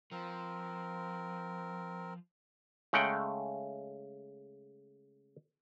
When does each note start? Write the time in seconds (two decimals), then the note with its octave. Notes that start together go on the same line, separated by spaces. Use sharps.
0.11 F3 C4 A#4
2.93 C#3 G#3 A3 F#5 G5